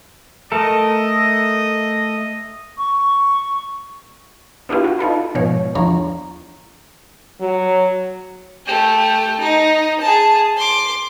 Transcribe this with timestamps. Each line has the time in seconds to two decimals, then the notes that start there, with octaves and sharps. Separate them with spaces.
0.52 A3 A4 A#4 D#5
2.78 C#6
4.69 B3 D4 E4 F4 G4
4.84 F#4
4.99 D#4 F4 A4 B4
5.35 G#2 B2 F3 C#5
5.75 E2 D3 F3 C#5 A#5
7.40 F#3
8.66 A3 G4
9.39 D#4
10.00 G#4 A5
10.56 C6 D6